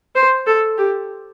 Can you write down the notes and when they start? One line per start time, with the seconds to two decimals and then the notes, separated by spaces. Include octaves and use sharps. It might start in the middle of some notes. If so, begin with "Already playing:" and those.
0.15 C5
0.47 A4
0.78 G4